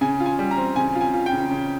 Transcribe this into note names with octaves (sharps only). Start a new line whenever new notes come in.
C#3 G#5
F4
G#5
G3
A#5
C4
C#3 G#5
F4
G#5
F4
G5
C#3
C#3